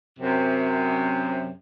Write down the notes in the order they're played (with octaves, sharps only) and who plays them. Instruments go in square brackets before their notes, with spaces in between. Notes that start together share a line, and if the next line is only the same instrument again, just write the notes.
[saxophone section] F#2 C3